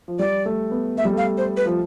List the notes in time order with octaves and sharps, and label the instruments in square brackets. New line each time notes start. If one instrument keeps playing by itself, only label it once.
[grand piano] F3
[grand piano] G3 [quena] D5
[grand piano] A3
B3
[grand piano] A3 [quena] E5
[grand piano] G3
[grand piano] A3 [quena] F5
[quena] C5
B4
[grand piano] F3